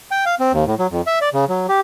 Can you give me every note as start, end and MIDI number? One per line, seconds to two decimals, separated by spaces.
0.11 0.25 79
0.26 0.35 77
0.40 0.52 60
0.53 0.65 39
0.66 0.75 45
0.79 0.87 54
0.91 1.02 41
1.07 1.19 76
1.21 1.29 74
1.34 1.45 49
1.49 1.66 54
1.69 1.80 67